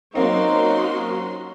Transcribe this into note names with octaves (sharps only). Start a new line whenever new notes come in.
F#3 A#3 C4 C#4 D#4 F#4 C6